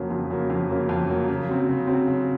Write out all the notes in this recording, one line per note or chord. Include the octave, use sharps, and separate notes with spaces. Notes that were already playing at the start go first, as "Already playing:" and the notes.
Already playing: F2 C#3 F#3 A#3
F2
C#3 F#3 A#3
F2
C#3 F#3 A#3
F2
C#3 F#3 A#3
C#3
F#3 C4
C#3
F#3 C4
C#3